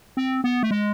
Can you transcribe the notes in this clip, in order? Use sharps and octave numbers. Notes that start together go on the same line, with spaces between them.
C4
B3
A3
G#3